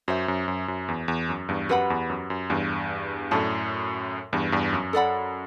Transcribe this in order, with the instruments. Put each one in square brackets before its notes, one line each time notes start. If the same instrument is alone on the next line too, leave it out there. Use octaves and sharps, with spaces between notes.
[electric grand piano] F#2 [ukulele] F#4 C5 E5
[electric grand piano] F#2
F#2
F#2
E2
E2
F#2
E2 G2
[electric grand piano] F#2 [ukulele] G4 B4 F#5 B5
[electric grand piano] E2
F#2
F#2
E2 G2
[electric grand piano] F#2 A2 [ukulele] A4 D5 A5
[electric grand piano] E2 G2
E2 G2
F#2
[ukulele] A4 D5 F#5 B5